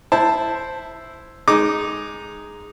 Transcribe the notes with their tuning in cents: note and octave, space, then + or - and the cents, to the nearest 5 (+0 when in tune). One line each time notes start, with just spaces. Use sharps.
E4 +0 C5 +0 A5 +0
G#3 +0 D#4 +0 D6 +0